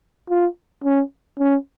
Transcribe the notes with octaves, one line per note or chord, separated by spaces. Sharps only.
F4
C#4
C#4